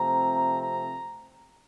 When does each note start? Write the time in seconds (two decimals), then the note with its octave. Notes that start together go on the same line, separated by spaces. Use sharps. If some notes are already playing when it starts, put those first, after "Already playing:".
Already playing: C3 F3 A3 C4 A#5
0.62 A#5